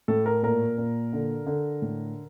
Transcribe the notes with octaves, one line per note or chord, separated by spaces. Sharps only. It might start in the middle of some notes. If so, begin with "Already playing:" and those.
A2 A4
A#4
A#2 A#4
A#2
D3
D3
A2